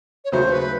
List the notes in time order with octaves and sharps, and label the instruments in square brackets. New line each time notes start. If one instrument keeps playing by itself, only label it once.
[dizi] C#5
[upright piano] D#2 C#3 F#3 A3 [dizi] C5
[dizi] B4